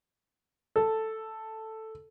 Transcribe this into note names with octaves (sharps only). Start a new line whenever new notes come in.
A4